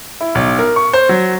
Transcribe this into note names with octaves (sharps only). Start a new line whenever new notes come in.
E4
B1
A#4
C#6
C5
F#3